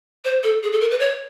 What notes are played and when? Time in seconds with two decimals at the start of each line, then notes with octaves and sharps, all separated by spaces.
0.24 C5
0.43 A4
0.63 G#4
0.72 A4
0.80 A#4
0.90 B4
0.99 C#5